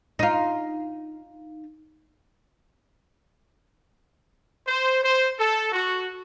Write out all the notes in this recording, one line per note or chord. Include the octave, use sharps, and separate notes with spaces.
D#4 F4
C5
C5
A4
F#4